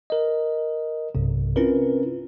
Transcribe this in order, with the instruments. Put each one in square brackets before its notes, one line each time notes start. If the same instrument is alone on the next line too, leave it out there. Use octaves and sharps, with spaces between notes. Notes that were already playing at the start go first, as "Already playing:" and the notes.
[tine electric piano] A#4 D#5
B1 G2 C3
C4 C#4 E4 F4 A#4 B4